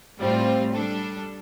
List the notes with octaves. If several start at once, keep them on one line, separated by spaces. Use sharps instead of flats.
A2 G3 C4 F4
G3 D4 A4